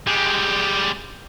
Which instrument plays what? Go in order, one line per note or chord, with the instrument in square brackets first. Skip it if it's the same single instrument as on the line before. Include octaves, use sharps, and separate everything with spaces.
[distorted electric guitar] G3 G#3